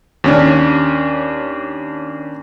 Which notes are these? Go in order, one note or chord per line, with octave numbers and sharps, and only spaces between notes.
D#2 C#4 D4